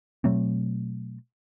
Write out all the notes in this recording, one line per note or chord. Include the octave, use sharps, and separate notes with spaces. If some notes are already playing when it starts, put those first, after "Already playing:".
B2 F#3 A3 C4